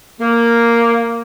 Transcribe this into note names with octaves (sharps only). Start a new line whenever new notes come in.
A#3